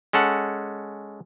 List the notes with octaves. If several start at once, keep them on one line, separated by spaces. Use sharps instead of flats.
G#3 C#4 A4 F#5